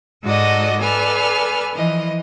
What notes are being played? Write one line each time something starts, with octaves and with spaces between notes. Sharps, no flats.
G#2 F#4 A4 D5 D#5 D#6
A4 B4 D5 G#5 F6
E3 F3 D#5